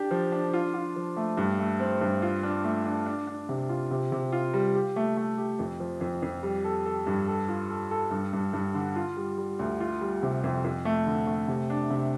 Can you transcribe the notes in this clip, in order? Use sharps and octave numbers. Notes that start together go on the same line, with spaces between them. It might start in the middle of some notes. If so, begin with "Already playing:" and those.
Already playing: D4 G4
F3
D4
F4
F4
F3
A3
G2
A3
C4
G2
F4
D4
A3
D4
D4
D4
C3
F4
C3
C3
F4
G3
G4
A3
A3
G4
F2
F3
F2
F2
G3
A4
A4
G2
A4
F4
A4
A4
G2
G2
G2
D3
F4
G3
G3
D2
F4
G3
C3
F2
F2
A3
D3
A3
C3
D4
C3